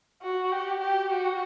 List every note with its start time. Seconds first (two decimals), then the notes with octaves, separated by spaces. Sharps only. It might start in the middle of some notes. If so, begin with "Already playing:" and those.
0.22 F#4
0.52 G4
0.81 G4
1.10 F#4